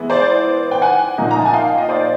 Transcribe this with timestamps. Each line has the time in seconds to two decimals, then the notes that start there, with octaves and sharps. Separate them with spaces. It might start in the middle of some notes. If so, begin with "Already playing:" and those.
Already playing: E3 G#3 B3
0.10 C5 D5
0.71 G5
0.82 F#5 G#5
1.18 A#2 F3 A#3 D#4
1.31 A#5
1.39 A5
1.45 G#5
1.53 F5 G5
1.78 D#5
1.89 C5 D5